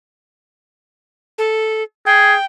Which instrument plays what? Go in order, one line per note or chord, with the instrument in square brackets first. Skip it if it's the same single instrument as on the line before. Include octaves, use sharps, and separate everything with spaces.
[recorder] A4
[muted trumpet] G#4 [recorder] G5